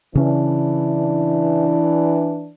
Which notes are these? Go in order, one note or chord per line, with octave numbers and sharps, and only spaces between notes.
C#3 E3 C#4 D4